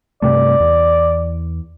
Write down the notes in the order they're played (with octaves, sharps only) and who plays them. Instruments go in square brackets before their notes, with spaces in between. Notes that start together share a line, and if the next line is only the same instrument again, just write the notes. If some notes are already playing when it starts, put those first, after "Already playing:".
[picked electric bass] G2 C3 A3 [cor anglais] D5
[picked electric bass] E2